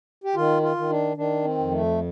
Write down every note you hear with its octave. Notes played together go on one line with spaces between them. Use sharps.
G4
D#3 F4
F4
D#3
D4
D#3 D4
C4
F2
A3